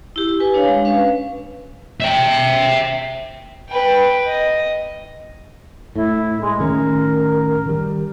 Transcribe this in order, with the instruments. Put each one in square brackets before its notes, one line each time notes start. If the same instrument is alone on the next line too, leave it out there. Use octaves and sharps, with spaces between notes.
[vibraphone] E4 G4
B4 G#5
D4 C#5 F5
G#3
C#4 B4 F5
[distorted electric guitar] E5 G5
[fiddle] B4 G5
D#5
[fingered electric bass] A2 [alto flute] E4
[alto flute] G#3
[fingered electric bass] A2 D#3 C#4 [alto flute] A#4
[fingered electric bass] D#3 G3